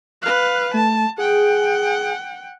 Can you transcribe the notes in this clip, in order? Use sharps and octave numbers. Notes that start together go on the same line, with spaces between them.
B4 F5 F#6
A3 A5
G#4 F#5 G5